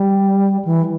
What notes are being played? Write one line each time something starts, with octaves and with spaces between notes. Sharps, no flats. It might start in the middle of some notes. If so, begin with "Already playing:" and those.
Already playing: G3
E3